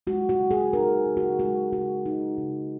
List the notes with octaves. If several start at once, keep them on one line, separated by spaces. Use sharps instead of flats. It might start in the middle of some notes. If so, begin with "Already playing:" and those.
G#3 F#4
F#4
C#3
G#4
D#4 A#4
C#3
F#4
G#3 F#4
C#3 F#4
D#4
C#3